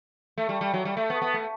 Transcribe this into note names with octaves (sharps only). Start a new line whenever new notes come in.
A3
G3
G3
F#3
G3
A3
B3
B3
A3